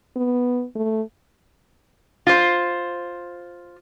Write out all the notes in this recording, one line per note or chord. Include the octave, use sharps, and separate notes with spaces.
B3
A3
F4 C5